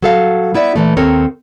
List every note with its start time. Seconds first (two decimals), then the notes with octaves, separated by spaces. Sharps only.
0.02 F#3 A4 F5
0.54 B3 E4 D5 E5
0.76 A#2 E3 A3
0.97 D#2 C4 A4 A#4 C#5